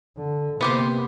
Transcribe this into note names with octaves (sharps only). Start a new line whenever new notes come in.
D3
C3 A#3 B3 G4 C5